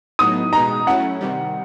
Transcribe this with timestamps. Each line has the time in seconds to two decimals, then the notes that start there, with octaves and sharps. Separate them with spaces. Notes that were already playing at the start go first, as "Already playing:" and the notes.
0.19 A2 F#3 B3 D#4 D#6
0.53 B2 G#3 B3 D#4 A#5
0.87 F#3 A3 C#4 E4 F#5
1.21 C3 D#3 G3